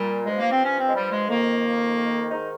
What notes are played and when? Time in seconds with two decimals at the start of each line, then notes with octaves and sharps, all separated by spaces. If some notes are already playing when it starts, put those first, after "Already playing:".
Already playing: A#2 G3
0.25 G2 F3 G#3
0.38 A#3
0.51 C4
0.64 C#4
0.77 C4
0.89 G#3
0.95 G3
1.11 G#3
1.28 F2 D#3 A#3
2.31 G#2 D#3 D#4